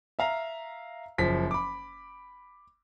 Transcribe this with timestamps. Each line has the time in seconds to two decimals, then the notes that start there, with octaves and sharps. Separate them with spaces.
0.19 E5 F5 A#5
1.18 F#1 F3 B6
1.51 B5 D6